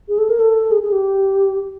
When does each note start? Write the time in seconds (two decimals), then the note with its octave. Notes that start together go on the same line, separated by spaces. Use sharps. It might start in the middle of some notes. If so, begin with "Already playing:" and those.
0.08 G#4
0.18 A4
0.29 A#4
0.40 A4
0.71 G#4
0.82 G#4
0.92 G4